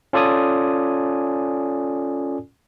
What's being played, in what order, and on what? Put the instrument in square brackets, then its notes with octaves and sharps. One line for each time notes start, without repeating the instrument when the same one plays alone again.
[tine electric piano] C#4 F4 A4 D5 G#5 D#6